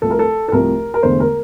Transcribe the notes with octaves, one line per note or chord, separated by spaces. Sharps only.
C2 C3 F3 A3 A4
A#4
A4
A4
C2 C3 F3 A3 A#4
A#4
E1 E2 D3 A3 C5
A#4